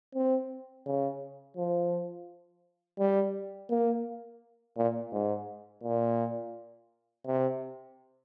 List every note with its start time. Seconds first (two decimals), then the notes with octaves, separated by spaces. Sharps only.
0.15 C4
0.86 C#3
1.57 F3
2.99 G3
3.70 A#3
4.77 A#2
5.12 G#2
5.83 A#2
7.26 C3